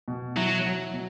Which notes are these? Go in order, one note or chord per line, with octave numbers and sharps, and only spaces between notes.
B2
F#3 E4
F#3
B2